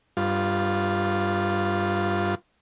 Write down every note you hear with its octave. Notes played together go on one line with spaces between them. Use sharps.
G2 F4